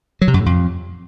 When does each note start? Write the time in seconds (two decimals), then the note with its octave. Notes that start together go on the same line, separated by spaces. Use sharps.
0.22 F#3
0.28 C3
0.34 F#2
0.40 A2
0.46 F2